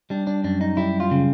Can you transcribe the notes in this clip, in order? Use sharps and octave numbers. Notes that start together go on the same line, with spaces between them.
G3 D4
D4
F#2 D4
D#4
G3 E4
F4
C#3